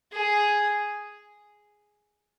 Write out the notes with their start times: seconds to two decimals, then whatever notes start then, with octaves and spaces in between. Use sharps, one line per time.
0.13 G#4